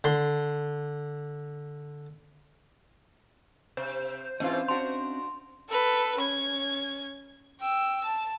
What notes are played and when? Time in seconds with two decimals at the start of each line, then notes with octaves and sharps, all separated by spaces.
0.04 D3 C6
3.77 C3 C5
4.40 G#2 E3 C4 C#4 F4 D#5
4.68 D4 F#4 C6
5.69 A4 B4
6.18 C#4 G#6
7.61 G5 E6
8.04 A5